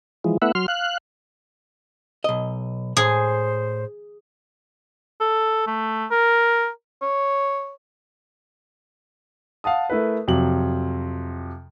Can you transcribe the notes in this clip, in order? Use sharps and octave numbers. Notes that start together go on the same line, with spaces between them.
E3 F3 G#3
A3 B3 E4 E5 F#5
F#3 C6 F6
F5 F#6
B1 D#5
A2 G#4 C5
A4
A3
A#4
C#5
F5 F#5 A5 D#6
A3 E4 A#4 B4
F2 C3 F#3 F#7